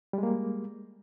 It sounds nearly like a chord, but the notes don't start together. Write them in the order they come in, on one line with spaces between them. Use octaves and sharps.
G3 G#3 A#3